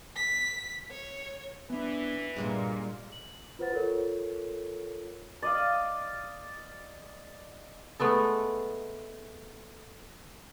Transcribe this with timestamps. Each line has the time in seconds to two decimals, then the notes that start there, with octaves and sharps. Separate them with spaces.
0.16 B6
0.91 C#5
1.70 E3 B3 D4
2.36 G2 A#2 G3 G#3 A#3 A#4
3.12 F#7
3.59 F4 B4 C5 F#5 A6
3.72 F4 A4 A#4 C#5
5.42 D5 D#5 F5
8.00 G#3 A3 B3 A4